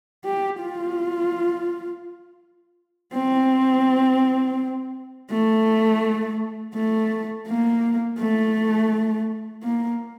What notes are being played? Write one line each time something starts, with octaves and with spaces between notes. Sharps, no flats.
G4
F4
C4
A3
A3
A#3
A3
A#3